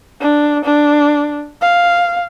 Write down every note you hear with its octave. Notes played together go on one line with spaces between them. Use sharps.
D4
D4
F5